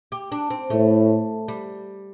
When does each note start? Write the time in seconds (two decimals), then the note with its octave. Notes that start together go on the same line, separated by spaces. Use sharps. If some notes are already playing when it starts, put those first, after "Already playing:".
0.12 G4
0.32 D4
0.50 C4
0.70 A2 A3
1.48 G3